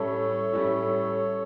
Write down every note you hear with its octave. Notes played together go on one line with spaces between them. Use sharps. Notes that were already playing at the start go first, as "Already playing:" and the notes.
Already playing: A2 G3 C#4 E4 A4 C#5
A2 G3 C#4 E4